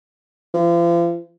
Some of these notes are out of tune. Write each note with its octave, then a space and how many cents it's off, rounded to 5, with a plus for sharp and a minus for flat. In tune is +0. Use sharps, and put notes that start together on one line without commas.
F3 -40